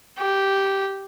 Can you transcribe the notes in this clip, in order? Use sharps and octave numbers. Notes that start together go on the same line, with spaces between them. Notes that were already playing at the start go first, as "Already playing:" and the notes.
G4